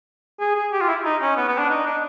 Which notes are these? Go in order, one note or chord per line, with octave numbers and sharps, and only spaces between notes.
G#4
G#4
G4
F4
E4
D#4
C#4
B3
B3
D4
D#4
D4